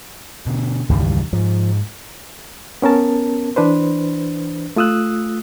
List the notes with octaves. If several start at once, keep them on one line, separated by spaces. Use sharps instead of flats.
B2 D3
E1 C#2 G2 D#3 E3 G3
G#2 F3
B3 C#4 A#4 A5
E3 D4 B4 C5
A3 F4 D#6 E6 F#6